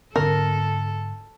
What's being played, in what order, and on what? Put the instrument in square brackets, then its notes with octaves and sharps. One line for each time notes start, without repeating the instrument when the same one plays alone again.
[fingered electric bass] G#2 D3 C4 [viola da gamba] A4 [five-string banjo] A#4